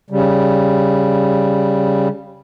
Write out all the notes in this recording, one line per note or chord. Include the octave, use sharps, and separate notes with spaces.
C#3 G3